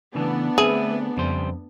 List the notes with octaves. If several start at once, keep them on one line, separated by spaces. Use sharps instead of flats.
C#3 E3 A3 B3 D4
D3 C4 G#4 B4 E5
F2 C#3 G3 C5